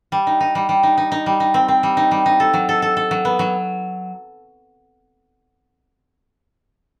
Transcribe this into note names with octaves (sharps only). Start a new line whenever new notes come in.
G3
D#4
D#4
G3
G3
D#4
D#4
D#4
G3
D#4
C4
C4
G3
D#4
G3
D#4
A4
F#3
A4
A4
A4
F#3
B3
F#3